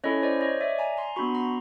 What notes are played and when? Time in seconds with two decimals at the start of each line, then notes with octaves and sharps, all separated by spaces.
0.04 C#4 E4 A4 C#5 D#5
0.22 C5 D5
0.41 C#5 D#5
0.61 D5 E5
0.79 G#5 A#5
0.97 A#5 C6
1.16 B3 D4 F#4 B5 C#6
1.35 A#5 C6